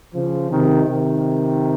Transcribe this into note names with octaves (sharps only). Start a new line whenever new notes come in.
C#3 F3
C3 D#3
C3 D#3